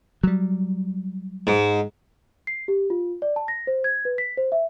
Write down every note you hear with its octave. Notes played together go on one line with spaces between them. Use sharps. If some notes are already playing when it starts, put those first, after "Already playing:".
F#3 G3
G#2
C7
G4
F4
D5
A5
A#6
C5
G#6
B4
B6
C5
E5